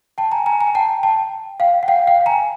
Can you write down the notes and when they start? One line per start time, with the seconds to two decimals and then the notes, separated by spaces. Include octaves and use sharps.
0.18 G5 A5
0.32 G#5 A#5
0.46 G#5 A#5
0.60 G#5 A#5
0.75 G5 A5
1.03 G5 A5
1.60 F5 G5
1.83 F#5
1.88 F5 G5
2.07 F5 G5
2.26 G#5 A#5